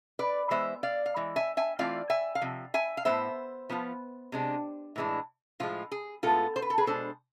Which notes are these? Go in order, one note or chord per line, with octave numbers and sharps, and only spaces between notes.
B4 D5
E3 G#3 B3 C5 E5
D5 F5
F5
E3 G#3
E5 G#5
E5 G#5
E3 A3 C4 F4 D5 F5
E5 G#5
F5
C3 F3
E5 G#5
F5
A2 G#3 B3 C5 E5
F3 B3 F4
C3 G#3 D4
A2 E3 G#3 D4
A2 F3 G#3 F4
G#4
A2 G#3 B3 F4 A4
C5
B4
A4
G#4 B4
B2 G#3 D4 A4 C5